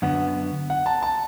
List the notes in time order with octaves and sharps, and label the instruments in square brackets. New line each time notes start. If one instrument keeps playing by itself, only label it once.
[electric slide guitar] F#2 D3 B3 [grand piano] F#5
[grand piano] F#5
A5
A5